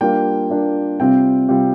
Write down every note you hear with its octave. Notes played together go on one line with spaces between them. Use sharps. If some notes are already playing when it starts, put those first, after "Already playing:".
G3 A#3 D4 F4 G5
G3 A#3 D4 F4
C3 G3 C4 F4 G5
C3 G3 C4 F4